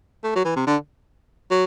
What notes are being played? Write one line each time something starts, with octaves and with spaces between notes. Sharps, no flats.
A3
F#3
E3
C3
D3
F#3